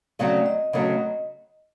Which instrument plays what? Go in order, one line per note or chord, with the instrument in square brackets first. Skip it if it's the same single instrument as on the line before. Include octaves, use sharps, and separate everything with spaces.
[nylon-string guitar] C#3 F#3 A3 C4 [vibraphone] D5
[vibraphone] D#5
[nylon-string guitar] C#3 F#3 A3 C4